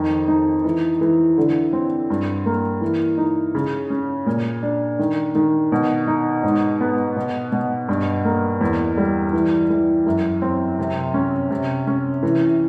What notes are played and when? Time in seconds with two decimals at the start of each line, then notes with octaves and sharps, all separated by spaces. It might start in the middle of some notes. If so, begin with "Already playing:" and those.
Already playing: F2 D#3
0.28 D#4
0.64 E3
1.01 E3
1.38 D3
1.73 C4
2.10 G2
2.46 A#3
2.81 E3
3.18 D#4
3.55 C#3
3.90 C#4
4.26 A#2
4.63 D4
4.99 D#3
5.35 D#3
5.72 B2
6.07 D#4
6.43 G#2
6.81 B3
7.16 B2
7.52 B2
7.89 G2
8.25 A#3
8.61 E2
8.97 G3
9.33 E3
9.70 E3
10.06 F#2
10.42 C4
10.79 C3
11.14 C#4
11.50 C3
11.87 C#4
12.23 E3